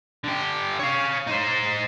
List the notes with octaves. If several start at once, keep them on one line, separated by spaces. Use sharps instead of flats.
D3 G4
C#5 F5
D#4 C5